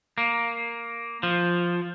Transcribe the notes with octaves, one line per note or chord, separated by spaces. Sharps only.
A#3
F3